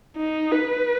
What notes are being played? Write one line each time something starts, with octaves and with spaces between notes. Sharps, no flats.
D#4
B4